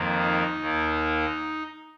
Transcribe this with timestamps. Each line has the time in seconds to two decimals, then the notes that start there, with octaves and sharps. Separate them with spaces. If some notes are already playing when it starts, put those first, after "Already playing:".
Already playing: F2 D#3 A#3
0.19 D#4
0.60 D#2 D#3 A#3